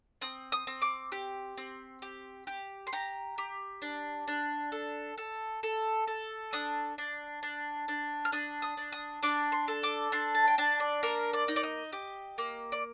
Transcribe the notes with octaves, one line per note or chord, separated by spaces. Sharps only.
C4 D#6
D#6
C4
D6
G4
C4
G4
G4
C6
G4 A#5
G4
D4
D4
A4
A4
A4
A4
D4 D#6
D4
D4
D4
F6
D4 D#6
D#6
D4
D#6
D4 D6
C6
A4
D6
D4 C6
A5
G5
D4 A5
D5
A#3 A#4
D5
D#4
D5
D#5
G4
A#3
D5